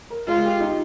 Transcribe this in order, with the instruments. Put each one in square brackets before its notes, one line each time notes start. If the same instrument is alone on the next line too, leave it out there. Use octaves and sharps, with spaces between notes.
[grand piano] A#4
[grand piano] G#3 [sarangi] F4
[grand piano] G4
D#4